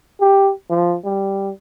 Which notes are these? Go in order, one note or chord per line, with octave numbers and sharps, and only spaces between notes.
G4
F3
G3